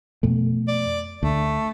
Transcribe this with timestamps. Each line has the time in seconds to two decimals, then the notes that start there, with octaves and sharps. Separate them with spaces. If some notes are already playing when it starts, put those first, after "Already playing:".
0.23 F2 B2 A3
0.68 D5
1.23 D2 A3